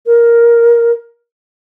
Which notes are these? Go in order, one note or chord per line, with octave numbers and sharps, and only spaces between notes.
A#4